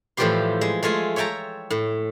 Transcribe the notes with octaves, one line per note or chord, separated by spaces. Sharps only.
A2 E3 F3 G3 G4 C6
G#3
G#3 A3 F4 G#5
C#5 E5 G5 A5 A#5
A2